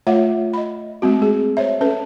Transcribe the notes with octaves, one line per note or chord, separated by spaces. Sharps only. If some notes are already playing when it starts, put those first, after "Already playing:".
A3 F4 C#5 E5 F#5
D#5 B5
G#3 A3 C4 F#4
G#4
C5 C#5 E5
C#4 A4 B4